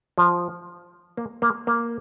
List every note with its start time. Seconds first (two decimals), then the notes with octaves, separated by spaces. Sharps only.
0.18 F3
1.17 A#3
1.42 A#3
1.67 A#3